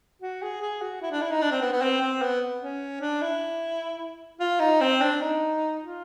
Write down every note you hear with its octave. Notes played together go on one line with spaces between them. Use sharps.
F#4
G#4
G#4
F#4
E4
D4
E4
D#4
D4
C4
B3
B3
C4
C4
B3
C#4
D4
E4
F4
D#4
C4
D4
D#4
F4